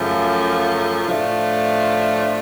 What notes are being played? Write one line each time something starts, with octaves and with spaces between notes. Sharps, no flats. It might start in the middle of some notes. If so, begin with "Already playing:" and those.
Already playing: F#2 C#3 F3 A3
A2 F3 A3 D4 F4